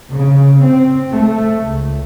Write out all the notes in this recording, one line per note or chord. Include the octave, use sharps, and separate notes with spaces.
C#3
C4
A3
C#2